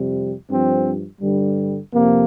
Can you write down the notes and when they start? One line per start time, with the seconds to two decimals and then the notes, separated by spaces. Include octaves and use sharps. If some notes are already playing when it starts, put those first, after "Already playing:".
Already playing: F2 C3 G3
0.49 G2 F3 C4
1.21 G2 D3 G3
1.93 F2 C3 F3 A#3